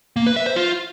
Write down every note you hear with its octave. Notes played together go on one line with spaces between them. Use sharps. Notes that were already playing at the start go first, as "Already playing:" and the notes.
A#3
B4
E5
C5
F4